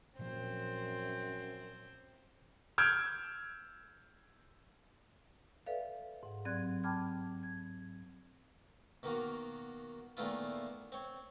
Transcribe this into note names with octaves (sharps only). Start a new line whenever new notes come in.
F#2 A#2 F3 C4 C5
E6 F6 G6 G#6 D7
A4 B4 D5 E5 F5
G#2 F#5
G2 F#3 C4 D5 F#6 G#6
G5 A5 B5 D6 F6 G#6
G#6
B2 D#3 A#3 F#4
A#2 D#3 A3 B3 E4 F4
C4 C#5